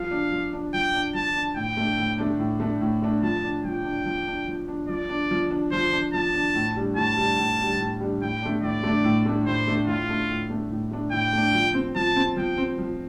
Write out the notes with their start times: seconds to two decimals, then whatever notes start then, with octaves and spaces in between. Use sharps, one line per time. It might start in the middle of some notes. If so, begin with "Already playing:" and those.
Already playing: F3 F5
0.11 D4
0.32 F3
0.53 D4
0.74 F3 G5
0.94 D4
1.14 F3 A5
1.35 D4
1.56 A2 G5
1.77 A3 D4
1.98 A2
2.18 A3 D4
2.40 A2
2.60 A3 D4
2.81 A2
3.02 A3 D4
3.22 F3 A5
3.44 D4
3.64 F3 G5
3.85 D4
4.06 F3
4.27 D4
4.47 F3
4.68 D4
4.88 F3 D5
5.09 D4
5.31 F3
5.51 D4
5.72 F3 C5
5.92 D4
6.14 F3 A5
6.34 D4
6.55 A2
6.77 G3 D4
6.96 A2 A5
7.17 G3 D4
7.38 A2
7.59 G3 D4
7.80 A2
8.01 G3 D4
8.22 A2 G5
8.42 A3 D4
8.63 A2 D5
8.83 A3 D4
9.04 A2
9.26 A3 D4
9.46 A2 C5
9.67 A3 D4
9.87 A2 F4
10.08 A3 D4
10.30 A2
10.50 A3 D4
10.71 A2
10.91 A3 D4
11.12 A2 G5
11.33 A3 D4
11.55 F3
11.74 C4
11.96 F3 A5
12.16 C4
12.36 F3 G5
12.58 C4
12.78 F3